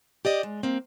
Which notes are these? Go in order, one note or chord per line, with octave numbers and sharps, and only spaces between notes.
G4 D5 D#5
G#3
A#3 C4